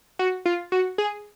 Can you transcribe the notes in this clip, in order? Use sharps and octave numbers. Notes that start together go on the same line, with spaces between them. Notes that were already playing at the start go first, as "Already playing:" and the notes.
F#4
F4
F#4
G#4